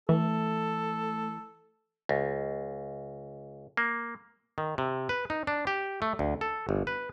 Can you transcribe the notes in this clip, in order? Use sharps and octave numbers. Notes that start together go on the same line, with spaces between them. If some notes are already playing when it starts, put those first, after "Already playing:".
E3 A3 A4
C#2
A#3
D#3
C3
B4
D#4
D4
G4
A3
D2
A4
G1
B4